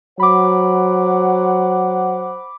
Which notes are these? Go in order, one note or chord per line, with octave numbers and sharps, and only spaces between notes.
F#3 C5 F#5 B5 D6